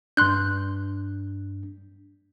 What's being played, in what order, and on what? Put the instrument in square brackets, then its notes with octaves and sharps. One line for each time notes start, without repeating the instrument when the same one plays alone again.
[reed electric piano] G2 D4 [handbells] C6 F#6 G6